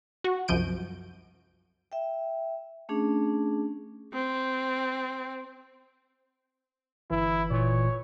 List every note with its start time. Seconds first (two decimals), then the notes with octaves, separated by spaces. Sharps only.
0.24 F#4
0.48 C2 F#2 F3 G6 D7 D#7
1.92 E5 G5
2.89 A3 C#4 D4 G#4
4.13 C4
7.10 G1 E3 E4
7.51 A#2 C#5